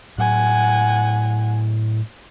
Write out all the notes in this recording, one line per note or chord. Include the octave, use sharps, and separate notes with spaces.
A2 F#3 F#5 G#5